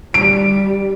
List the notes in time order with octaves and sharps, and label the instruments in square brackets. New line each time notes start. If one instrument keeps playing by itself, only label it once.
[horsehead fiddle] G3 [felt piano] D7